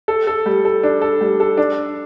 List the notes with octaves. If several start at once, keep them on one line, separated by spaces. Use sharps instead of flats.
A4
A4
G3
A4
D4
A4
G3
A4
D4